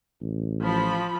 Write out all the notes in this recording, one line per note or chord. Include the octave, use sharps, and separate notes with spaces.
A1
F3 B5